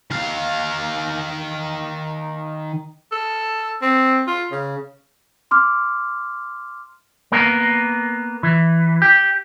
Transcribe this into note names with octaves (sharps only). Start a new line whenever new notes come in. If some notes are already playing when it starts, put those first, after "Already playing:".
D#3 F5
A4
C4
F4
C#3
C6 D6 F6
A#3 B3 A#4
E3
G4